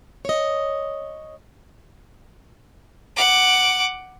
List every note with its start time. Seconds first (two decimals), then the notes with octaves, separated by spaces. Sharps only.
0.25 C#5 D#5
3.16 F#5 D6